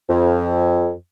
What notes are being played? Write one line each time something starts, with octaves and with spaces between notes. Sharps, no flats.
F2